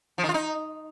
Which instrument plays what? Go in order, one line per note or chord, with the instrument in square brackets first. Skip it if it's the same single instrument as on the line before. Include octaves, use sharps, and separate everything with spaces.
[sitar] F3
D#3
F4
D#4